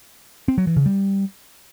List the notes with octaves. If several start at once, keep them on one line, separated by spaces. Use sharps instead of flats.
C4
F#3
E3
C#3
G3